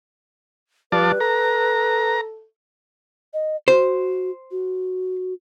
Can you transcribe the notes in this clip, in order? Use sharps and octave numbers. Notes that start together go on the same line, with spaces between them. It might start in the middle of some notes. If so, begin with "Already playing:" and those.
F3 G3 B4 D5 A5
A4 A#5
D#5
F#4 C5
F#4